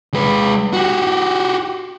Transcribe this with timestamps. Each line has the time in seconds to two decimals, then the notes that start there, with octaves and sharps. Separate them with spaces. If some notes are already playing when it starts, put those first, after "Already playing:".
0.14 G#3 B4
0.73 F#4 G4